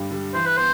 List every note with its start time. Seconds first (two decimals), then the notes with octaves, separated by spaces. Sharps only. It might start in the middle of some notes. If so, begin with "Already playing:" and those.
Already playing: G2 D3 G3
0.11 D3 G3
0.34 E3 C5
0.46 B4
0.57 B3 C5